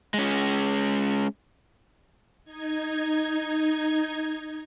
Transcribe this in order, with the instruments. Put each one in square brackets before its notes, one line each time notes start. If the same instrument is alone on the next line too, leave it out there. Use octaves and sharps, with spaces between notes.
[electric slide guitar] G#3 C#4
[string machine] D#4 G#6